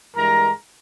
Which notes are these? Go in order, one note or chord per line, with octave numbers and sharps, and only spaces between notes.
G2 E3 G#3 A#4 A#5